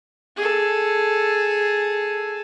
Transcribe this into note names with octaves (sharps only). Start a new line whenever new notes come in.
G#4 A4